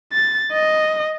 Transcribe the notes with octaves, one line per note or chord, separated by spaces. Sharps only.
A6
D#5